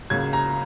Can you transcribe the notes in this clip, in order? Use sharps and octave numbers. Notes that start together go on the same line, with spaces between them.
C#2 C#3 F#3 A#3 G#6
A#5